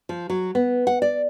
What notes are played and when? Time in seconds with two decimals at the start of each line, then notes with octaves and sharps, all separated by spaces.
0.09 F3
0.30 F#3
0.55 B3
0.87 F#5
1.02 D5